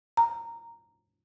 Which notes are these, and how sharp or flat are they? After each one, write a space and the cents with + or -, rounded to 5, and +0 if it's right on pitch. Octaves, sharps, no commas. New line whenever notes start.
A#5 -10